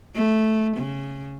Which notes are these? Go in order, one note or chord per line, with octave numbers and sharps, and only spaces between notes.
A3
C#3